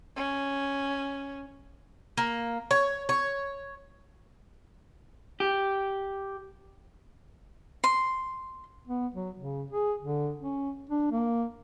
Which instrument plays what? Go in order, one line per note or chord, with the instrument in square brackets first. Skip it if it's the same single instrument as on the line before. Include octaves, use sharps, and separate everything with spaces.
[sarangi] C#4
[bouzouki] A#3
C#5
C#5
[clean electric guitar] G4
[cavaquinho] C6
[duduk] B3
F#3
C#3
G#4
D3
C#4
D4
A#3